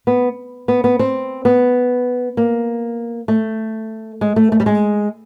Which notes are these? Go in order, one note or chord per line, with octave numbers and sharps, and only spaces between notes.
B3
B3
B3
C4
B3
A#3
A3
G#3
A3
A3
G3
G#3